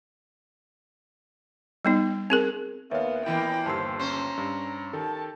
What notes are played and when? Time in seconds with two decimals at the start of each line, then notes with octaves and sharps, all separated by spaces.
1.85 G3 B3 D#4
2.30 C4 G#4 A#4
2.91 D#2 B3 A#4 C#5 E5 F5
3.26 A#2 E3 A#3 B3 E4 G5
3.66 G1 D#2 G4 C5 A5 C6 E6 C7
3.99 C#4 C5 A#5
4.38 G2
4.93 D#3 G4 A4 A5